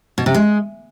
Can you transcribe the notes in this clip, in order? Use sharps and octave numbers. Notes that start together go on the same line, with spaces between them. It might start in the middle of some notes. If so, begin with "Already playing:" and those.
B2
C3
G#3